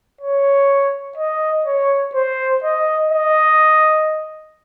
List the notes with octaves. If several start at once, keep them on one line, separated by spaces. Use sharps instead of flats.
C#5
D#5
C#5
C5
D#5
D#5